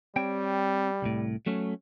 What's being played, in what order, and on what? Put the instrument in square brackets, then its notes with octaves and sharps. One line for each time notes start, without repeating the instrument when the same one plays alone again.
[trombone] G3 [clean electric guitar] C4 C#5 G5
[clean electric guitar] C2 A2
F#3 A3 C#4